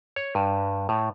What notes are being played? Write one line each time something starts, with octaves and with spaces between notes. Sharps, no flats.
C#5
G2
A2